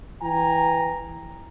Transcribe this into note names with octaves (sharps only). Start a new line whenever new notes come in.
E3 G5 G#5 A#5